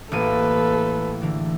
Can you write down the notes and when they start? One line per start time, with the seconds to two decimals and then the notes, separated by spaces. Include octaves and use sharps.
0.12 A1 A#3 A4 B4 D#7
1.22 D3 E3